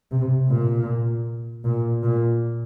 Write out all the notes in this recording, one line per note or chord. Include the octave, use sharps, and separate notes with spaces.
C3
A#2
A#2
A#2